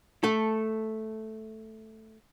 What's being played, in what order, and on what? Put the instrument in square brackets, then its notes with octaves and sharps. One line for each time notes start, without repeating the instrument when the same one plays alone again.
[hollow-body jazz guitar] A3 A4